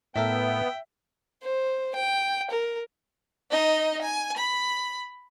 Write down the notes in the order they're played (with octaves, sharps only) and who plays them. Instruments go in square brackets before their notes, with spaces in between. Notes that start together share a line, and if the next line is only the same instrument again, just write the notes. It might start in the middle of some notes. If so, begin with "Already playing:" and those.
[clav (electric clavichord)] A2 A4 A#4 [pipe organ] B3 [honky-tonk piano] E5 [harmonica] G5
[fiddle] C5
G5
A#4
[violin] D#4 D#5
G#5
B5